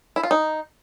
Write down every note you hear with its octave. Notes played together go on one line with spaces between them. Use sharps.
E4
F4
D#4